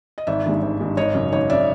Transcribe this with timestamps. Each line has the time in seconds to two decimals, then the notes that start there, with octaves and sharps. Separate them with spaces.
0.18 D#5
0.27 G#1 D5 E5
0.45 G2 D#3 G#3
0.62 G#1
0.80 G2 D#3 G#3
0.97 G#1 C#5 D#5
1.14 F#2 C#3
1.32 G#1 C#5 D#5
1.50 D5 E5
1.52 C#3